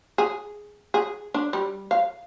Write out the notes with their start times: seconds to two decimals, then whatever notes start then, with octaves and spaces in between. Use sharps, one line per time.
0.18 G#4
0.94 G#4
1.34 D4
1.53 G3
1.91 F5